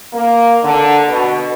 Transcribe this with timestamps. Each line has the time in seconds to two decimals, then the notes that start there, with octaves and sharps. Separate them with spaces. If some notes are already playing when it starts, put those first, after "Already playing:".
0.13 A#3
0.64 D3
1.08 B2